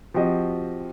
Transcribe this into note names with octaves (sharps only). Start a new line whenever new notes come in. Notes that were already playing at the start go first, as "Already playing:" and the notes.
F3 C4 F#4 G4 D#5